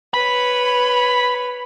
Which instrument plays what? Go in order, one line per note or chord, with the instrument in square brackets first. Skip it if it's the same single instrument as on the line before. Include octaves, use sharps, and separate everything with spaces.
[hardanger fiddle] B4 C#5 [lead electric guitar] B5